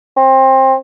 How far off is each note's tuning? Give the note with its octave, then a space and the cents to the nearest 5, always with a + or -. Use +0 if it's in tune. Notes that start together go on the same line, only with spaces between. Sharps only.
C4 +25